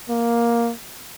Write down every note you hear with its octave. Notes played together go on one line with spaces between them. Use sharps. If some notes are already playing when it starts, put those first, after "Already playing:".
A#3